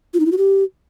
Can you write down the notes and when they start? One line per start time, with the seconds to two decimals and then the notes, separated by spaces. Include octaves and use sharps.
0.14 F4
0.20 D#4
0.26 E4
0.32 F#4
0.38 G4